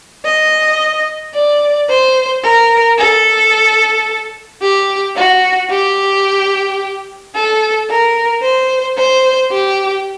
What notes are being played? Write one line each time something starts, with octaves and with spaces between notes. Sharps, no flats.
D#5
D5
C5
A#4
A4
G4
F#4
G4
A4
A#4
C5
C5
G4